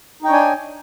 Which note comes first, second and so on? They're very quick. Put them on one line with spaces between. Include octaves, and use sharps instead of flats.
D#4 G5 C#5 D4 G#5